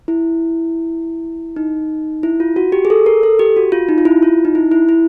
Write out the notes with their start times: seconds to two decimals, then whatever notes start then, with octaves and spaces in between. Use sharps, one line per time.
0.08 E4
1.56 D#4
2.23 E4
2.40 F4
2.56 F#4
2.72 G4
2.85 G#4
2.90 A4
3.06 A#4
3.23 A4
3.39 G4
3.57 F#4
3.72 F4
3.89 D#4
3.98 F4
4.05 E4
4.23 F4
4.45 D#4
4.55 E4
4.72 E4
4.89 E4